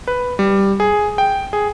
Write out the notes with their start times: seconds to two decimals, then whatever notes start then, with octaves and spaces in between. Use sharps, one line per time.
0.07 B4
0.39 G3
0.80 G#4
1.18 G5
1.53 G#4